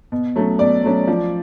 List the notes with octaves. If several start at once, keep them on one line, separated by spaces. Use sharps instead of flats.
B2
F#3 A3 C#4
B2 D5
F#3 A3 C#4
F3